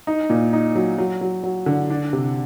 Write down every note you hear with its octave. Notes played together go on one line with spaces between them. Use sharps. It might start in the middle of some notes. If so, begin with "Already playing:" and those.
D#4
A#2
D#4
F#3
F#3
F#3
F#3
D3
D4
C3